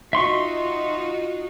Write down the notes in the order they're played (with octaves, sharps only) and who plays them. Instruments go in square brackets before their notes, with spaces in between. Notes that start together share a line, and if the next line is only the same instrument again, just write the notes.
[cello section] D#4 F4 F#4 [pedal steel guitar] E5 C6 C#6